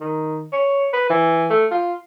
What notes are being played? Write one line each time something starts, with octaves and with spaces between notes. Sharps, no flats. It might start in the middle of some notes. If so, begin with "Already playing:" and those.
D#3
C#5
B4
E3
A3
F4